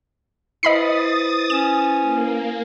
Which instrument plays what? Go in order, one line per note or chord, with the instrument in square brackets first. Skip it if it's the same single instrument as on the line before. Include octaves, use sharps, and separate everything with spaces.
[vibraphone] E4 B4 C5 [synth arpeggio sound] D#5 B5 C7 [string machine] D#6 A6
[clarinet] C#4 [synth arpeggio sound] E7
[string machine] A#3